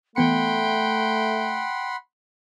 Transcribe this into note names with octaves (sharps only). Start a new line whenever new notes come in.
E3 A3 B3 F#5 G5 B5 C6 C#7